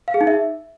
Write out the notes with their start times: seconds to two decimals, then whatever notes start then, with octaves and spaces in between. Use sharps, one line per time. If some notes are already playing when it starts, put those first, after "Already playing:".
0.08 F5
0.14 G#4
0.21 D#4
0.27 E5